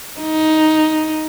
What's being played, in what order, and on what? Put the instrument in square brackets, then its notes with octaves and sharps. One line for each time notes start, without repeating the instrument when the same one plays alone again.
[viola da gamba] D#4